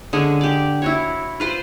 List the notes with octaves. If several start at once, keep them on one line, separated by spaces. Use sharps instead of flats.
D3 G#3 C#4 G#4
G4 D5
E4 F#4 C#5
F4 B4 C5